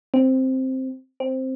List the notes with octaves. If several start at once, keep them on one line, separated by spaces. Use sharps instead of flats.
C4
C4